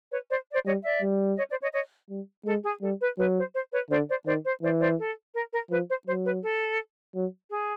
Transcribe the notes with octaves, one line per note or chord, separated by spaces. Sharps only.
B4 C#5
C5 D5
C5 D5
G3 C#5 D#5
D5 E5
G3
C#5 D#5
C5 D5
C#5 D#5
C#5 D#5
G3
G#3 A4
G#4
G3 A4
B4
F#3 B4
C5
C5
B4 C#5
D3 C5 D5
C5 D5
D#3 C5 D5
C5
E3 C5 D5
C5 D5
A4
A#4
A#4
F3 B4
C5
F#3 C5
B4
A4
F#3
G#4